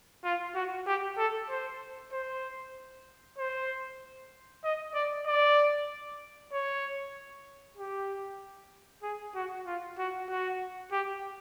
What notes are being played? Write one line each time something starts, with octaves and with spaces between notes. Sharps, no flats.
F4
F#4
G4
A4
C5
C5
C5
D#5
D5
D5
C#5
G4
G#4
F#4
F4
F#4
F#4
G4